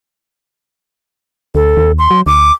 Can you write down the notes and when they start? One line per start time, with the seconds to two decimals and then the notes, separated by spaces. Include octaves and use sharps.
1.55 D2 A4
1.77 D#2
1.98 C6
2.11 F#3
2.26 D2 D6